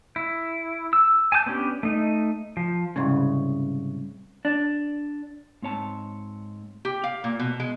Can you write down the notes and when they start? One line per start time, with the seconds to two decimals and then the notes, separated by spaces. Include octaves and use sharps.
0.16 E4
0.93 E6
1.32 G#5 A5 D6 G6
1.46 B3 C#4 D4 G4
1.83 A3 D#4
2.57 F3
2.96 C2 G#2 C#3
4.45 D4
5.62 G#2 C4 C#5 A5
6.85 G4
7.04 F5
7.24 A#2
7.39 B2
7.60 G#3